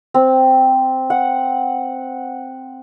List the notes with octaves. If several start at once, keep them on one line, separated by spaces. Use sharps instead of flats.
C4
F#5